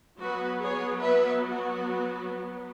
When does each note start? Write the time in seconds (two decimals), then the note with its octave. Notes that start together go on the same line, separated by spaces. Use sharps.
0.20 F#3 B3 F#4 B4
0.61 G#4 C#5
1.01 B4 E5
1.42 F#4